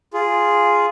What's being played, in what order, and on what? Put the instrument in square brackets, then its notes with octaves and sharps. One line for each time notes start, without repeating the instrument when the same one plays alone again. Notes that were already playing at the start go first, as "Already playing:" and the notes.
[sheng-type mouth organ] F4 G#4